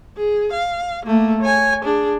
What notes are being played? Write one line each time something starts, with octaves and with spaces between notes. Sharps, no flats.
G#4
F5
A3 A#3
C#5 G#5
D4 G#4